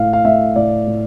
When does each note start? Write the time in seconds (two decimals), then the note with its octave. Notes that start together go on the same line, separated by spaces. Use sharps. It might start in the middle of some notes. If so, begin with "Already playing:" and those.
Already playing: A2 A3 F5
0.13 F5
0.25 A3 E5
0.56 A2 D5
0.87 A2